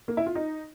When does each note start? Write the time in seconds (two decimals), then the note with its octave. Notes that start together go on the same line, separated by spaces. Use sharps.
0.08 A#3
0.17 E4
0.26 F4
0.35 D#4